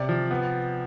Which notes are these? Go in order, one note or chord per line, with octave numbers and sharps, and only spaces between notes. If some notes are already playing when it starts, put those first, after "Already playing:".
Already playing: C3 D5
F3
B3